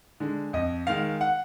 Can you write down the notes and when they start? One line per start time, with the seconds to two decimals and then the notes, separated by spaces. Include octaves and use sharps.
0.20 D3 G#3
0.53 F2 D#5
0.87 D#3 G#3 F5
1.21 F#5